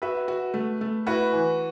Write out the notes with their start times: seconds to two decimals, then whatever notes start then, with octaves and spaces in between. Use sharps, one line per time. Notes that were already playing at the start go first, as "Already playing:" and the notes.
0.02 F#4 B4 E5
0.28 F#4
0.54 A3
0.81 A3
1.06 E4 F#4 B4
1.33 E3